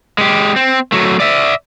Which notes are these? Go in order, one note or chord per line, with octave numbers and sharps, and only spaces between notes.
G#3 G4
C4
F#3 A3
D5 E5